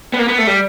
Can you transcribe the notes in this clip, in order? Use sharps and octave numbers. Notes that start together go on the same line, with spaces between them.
B3
A#3
B3
A3
G3